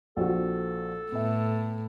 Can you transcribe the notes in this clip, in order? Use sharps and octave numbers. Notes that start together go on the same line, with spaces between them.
A#1 C4 F#4 A4
A2 B3 E5